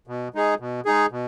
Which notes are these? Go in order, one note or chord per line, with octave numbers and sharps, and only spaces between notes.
B2
G#3 D#4 G#4
B2
G#3 D#4 G#4
B2